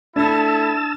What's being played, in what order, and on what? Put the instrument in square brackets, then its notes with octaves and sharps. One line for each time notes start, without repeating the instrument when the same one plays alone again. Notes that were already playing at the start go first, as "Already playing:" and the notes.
[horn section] A3 E4 [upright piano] D4 [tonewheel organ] A5 E6